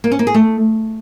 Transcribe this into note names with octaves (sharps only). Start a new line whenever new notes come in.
A#3
C#4
A#3
G#4
A3